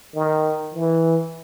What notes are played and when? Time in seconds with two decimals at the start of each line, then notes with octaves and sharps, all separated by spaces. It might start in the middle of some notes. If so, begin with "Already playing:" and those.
0.15 D#3
0.74 E3